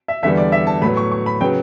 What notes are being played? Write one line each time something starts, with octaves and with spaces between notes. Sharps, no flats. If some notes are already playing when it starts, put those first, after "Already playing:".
E5
E2 D3 G3 B3 E5
D5
E5
A5
A2 F#3 B3 B5
C#6
C#6
B5
C#3 F#3 B3 G5